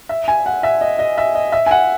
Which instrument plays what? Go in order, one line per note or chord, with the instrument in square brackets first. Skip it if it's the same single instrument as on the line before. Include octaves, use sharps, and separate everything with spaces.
[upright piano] E5
G#5
F#5
E5
D#5
D#5
E5
D#5
E5
G#5
F#5